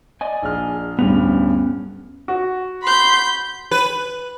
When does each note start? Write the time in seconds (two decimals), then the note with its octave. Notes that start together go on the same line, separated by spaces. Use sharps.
0.21 D5 D#5 G#5
0.43 A#1 G#4 F6
0.99 D1 G2 B3 C#4 F7
2.28 F#4
2.83 B5 C6 G6
3.71 B4